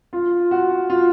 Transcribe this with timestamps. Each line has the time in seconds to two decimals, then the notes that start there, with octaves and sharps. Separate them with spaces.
0.13 F4
0.51 F#4
0.90 F4